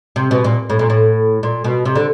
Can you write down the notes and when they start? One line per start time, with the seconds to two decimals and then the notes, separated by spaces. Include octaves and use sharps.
0.16 C3
0.31 B2
0.44 A#2
0.70 A2
0.79 A#2
0.90 A2
1.43 A#2
1.64 B2
1.85 C3
1.95 D3